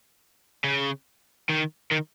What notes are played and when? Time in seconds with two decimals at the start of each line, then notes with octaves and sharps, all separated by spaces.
0.64 C#3
1.49 D#3
1.91 D#3